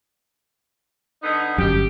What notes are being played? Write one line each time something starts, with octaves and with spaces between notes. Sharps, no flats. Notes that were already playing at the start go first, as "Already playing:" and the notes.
D3 B3 D#4
G1 F#2 G4